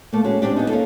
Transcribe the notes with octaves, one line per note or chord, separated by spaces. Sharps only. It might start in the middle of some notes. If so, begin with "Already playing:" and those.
A3 A#3
G#3 C#4 F#4
G#3 C4 D4 G4
B3 D#4
A#3 C#4 F4 A4